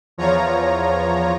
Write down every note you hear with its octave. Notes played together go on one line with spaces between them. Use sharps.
E2 F3 F4 C#5 A#5